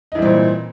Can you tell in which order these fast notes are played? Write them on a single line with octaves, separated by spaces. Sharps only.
D#4 E3 G3 C4 A#2